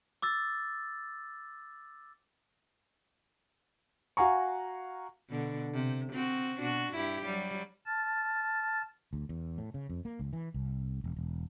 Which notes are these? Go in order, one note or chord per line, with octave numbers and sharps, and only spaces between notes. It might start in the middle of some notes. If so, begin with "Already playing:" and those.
D6 E6 A6
F#4 F5 F#5 G#5 A#5 C#6
B2 D3
C3
C4 F#4
B2 D4 F#4
G2 E4 G4
F#3 G3
A5 F6 A6
D2
E2
A2
C#3
F2
A#3
C#2
E3
C2
E1
E1